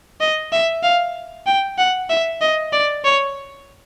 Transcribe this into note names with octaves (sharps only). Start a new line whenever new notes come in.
D#5
E5
F5
G5
F#5
E5
D#5
D5
C#5